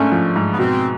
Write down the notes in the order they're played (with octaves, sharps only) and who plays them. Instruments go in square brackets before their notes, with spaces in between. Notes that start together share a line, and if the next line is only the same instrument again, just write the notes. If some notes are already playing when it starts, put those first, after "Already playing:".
Already playing: [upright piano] G#2 A3 D4 [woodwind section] C#4
[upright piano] F3
G#2
[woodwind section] B3
[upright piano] B2 [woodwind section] C4